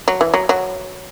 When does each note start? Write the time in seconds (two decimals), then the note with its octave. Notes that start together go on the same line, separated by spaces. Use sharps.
0.08 F#3
0.21 E3
0.34 F#3
0.49 F#3